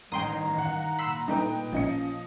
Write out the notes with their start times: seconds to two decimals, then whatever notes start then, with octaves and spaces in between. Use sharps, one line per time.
0.12 A1 G2 D#3 G5 A#5 C6 D#6
0.57 F5 F#5
0.99 A#2 B5 C6 E6
1.28 G2 A3 D#4 B4 G5
1.73 A1 F3 C#4 D#5 C#7